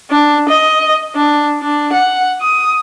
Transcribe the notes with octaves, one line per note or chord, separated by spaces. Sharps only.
D4
D#5
D4
D4
F#5
D#6